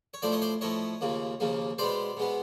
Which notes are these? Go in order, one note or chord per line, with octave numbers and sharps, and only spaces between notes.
C#5
A2 F3 A3 C5 D5
C#5 D#5
C5 D5
A2 F3 A3 C#5 D#5
D#2 C#3 F3 A#3
D#2 C#3 F3 A#3
B2 G#3 B3 C5 D5
B2 G#3 B3